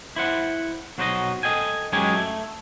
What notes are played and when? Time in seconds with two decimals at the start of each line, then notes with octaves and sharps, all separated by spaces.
0.16 E4 C5 F#5
0.98 B1 F#3 F#4 C5 D5 D#5
1.43 A4 D#5 G5 G#5
1.92 F#2 G#3 D#4 G4 C#5 G#5
2.15 A3